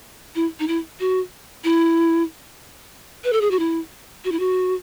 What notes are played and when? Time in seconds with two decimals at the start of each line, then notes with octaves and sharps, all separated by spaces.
0.35 E4
0.60 D#4
0.68 E4
1.00 F#4
1.64 E4
3.24 B4
3.33 A4
3.41 G#4
3.51 F#4
3.59 E4
4.25 F#4
4.32 E4
4.40 F#4